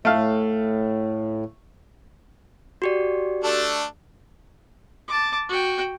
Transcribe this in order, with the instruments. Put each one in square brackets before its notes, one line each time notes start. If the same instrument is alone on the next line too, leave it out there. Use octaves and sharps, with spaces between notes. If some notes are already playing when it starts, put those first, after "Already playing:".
[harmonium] A2 [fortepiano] A3 F5
[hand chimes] F#4 G4 D5
[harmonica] A3 D4 A4
[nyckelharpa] A5 D6
F#4 G5